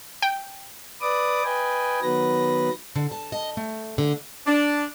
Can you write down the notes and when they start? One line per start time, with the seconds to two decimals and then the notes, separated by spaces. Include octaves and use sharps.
0.22 G5
1.01 B4 D5 D6 D#6
1.44 B4 D#5 G5 G#5
2.02 D#3 F#3 B3 B4 A#6
2.96 D3
3.11 A5
3.32 D#5
3.57 A3
3.98 D3
4.47 D4